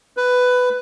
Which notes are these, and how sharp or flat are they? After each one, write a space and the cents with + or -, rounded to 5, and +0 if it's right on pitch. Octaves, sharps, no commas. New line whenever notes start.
B4 +10